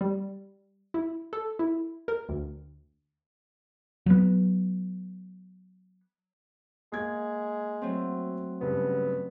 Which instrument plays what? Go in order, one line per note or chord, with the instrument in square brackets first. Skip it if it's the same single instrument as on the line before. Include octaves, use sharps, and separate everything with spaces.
[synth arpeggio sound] G3
E4
A4
E4
A#4
D2
[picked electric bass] F#3 B3
[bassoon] G#3 [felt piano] A#3 G#6
[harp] F#3 A3 C4
[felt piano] G2 C#3 [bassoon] B3